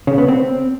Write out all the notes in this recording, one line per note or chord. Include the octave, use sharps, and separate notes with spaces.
C#3
B3
C4